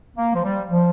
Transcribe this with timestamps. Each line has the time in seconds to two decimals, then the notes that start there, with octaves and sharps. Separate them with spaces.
0.17 A#3
0.34 F3
0.43 G3
0.69 F3